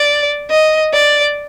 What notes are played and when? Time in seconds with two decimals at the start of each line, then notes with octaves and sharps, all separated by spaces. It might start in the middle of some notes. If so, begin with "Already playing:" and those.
Already playing: D5
0.51 D#5
0.93 D5